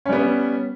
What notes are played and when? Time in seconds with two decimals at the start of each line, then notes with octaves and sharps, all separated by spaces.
0.06 C#4
0.09 G3
0.12 B3